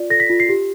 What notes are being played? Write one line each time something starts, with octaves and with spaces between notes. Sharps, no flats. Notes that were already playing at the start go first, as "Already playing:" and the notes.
Already playing: F4 D5
A4 A#6
B6
F4
C7
G4